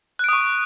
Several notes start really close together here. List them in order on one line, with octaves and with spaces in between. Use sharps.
F#6 D7 D#6 C#6